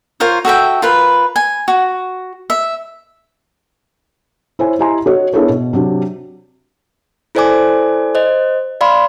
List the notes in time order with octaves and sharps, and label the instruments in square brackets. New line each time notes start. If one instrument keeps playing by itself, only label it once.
[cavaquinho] F4 A#4 C5 C#5
F#4 A4 E5 G5
F4 A#4 B4
G#5
F#4
E5
[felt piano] E4 C5 C#5 G#5
E4 G4 D#5 G#5 A#5 C6
F#4 C#5 D#5
B3 D4 E4 G#4 A#4 C#5
B2
C3 F#3 D4 G4
[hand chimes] E4 A4 C5 D5 G#5 D6
C5 D#5
D5 F5 B5 C6